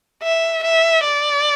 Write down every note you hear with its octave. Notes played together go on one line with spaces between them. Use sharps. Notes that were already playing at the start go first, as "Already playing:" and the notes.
E5
E5
D5